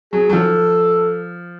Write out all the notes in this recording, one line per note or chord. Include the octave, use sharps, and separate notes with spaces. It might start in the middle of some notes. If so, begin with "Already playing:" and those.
F#3 G#4
F#3
F3 A4